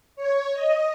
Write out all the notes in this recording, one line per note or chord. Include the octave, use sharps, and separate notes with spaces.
C#5
D#5